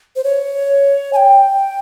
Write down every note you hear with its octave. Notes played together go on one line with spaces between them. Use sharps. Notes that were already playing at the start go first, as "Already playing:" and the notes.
C5
C#5
G#5
G5